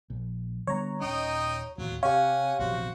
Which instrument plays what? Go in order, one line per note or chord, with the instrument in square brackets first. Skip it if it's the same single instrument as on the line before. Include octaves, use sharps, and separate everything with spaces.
[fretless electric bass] A#1
[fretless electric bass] D3 G3 B3 [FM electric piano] C#5 A#5
[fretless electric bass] D#1 C#4 [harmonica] D#4 D#5 G5
[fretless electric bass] D1 D#2 [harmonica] F#3 F4
[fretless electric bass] C3 [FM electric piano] G4 C#5 [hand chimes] F5 [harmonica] F#5 G#5
[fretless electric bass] A#1 E2 C3 [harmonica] F#4 C5